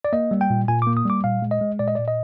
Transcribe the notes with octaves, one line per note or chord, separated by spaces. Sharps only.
D5
A#3 D#5
G3
G5
A#2
A#2 G#5
D6
A#3
D#6
G3 D6
A#2 F5
G#3
D#5
G#3
A#2 D5
D#5
A#2 D5
D#5